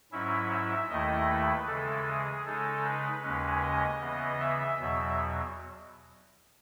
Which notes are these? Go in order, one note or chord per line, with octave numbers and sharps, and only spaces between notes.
G#2 F#3 C#4 E4 E5
E5
D#2 D#3 A3 E4 D#5
B4
C#3 E3 G#3 A4
G#4
C#3 G#3 D#4 A4
B4
D#2 C#3 G#3 C#4
D#5
C#3 E3 B3
E5
E2 B2 F#3